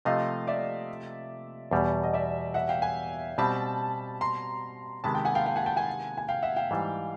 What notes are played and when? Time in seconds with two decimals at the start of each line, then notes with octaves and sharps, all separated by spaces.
0.05 C3 F3 A3 D#5 F5
0.47 D5 E5
1.71 E2 B2 G3
2.03 D#5
2.14 D5 E5
2.54 E5 F#5
2.69 F5 G5
2.82 F#5 G#5
3.38 B2 G3 C4 A5 B5
4.21 A#5 C6
5.04 C3 D#3 G#3 B3 A5 B5
5.15 G5 A5
5.25 F#5 G#5
5.35 F5 G5
5.46 F5 G5
5.56 F#5 G#5
5.66 G5 A5
5.76 F#5 G#5
6.18 G#5
6.29 F5 G5
6.43 E5 F#5
6.56 F5 G5
6.71 G#2 E3 G3